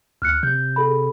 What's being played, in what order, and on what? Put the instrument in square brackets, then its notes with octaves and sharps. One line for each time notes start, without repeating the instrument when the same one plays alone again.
[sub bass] D2 [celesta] F6 F#6 C#7
[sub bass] C3 [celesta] G6
[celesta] G#4 A4 B5